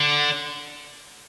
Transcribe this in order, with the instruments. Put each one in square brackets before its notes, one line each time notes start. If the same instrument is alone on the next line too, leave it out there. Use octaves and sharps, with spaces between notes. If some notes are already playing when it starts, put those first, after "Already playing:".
Already playing: [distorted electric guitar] D3